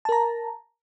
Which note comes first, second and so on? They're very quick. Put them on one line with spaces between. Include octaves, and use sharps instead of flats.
A5 A#4 A#5